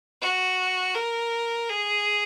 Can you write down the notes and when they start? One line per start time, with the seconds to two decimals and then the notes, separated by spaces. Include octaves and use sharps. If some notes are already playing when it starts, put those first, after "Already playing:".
0.22 F#4
0.95 A#4
1.69 G#4